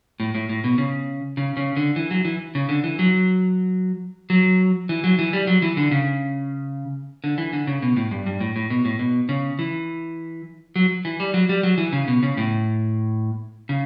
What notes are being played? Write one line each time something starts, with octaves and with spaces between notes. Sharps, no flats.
A2
A2
A2
B2
C#3
C#3
C#3
D3
E3
F#3
E3
C#3
D3
E3
F#3
F#3
E3
F#3
E3
G3
F#3
E3
D3
C#3
D3
E3
D3
C#3
B2
A2
G2
G2
A2
A2
B2
A2
B2
C#3
E3
F#3
E3
G3
F#3
G3
F#3
E3
C#3
B2
C#3
A2
C#3